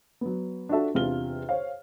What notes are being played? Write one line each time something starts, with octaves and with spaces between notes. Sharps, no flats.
F#3 B3
D4 F4 F#4 A4 E5 A5
E2 C3 D4 F4 F6 G7
C5 C#5 F5